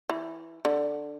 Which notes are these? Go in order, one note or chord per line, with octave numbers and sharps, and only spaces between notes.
E3
D3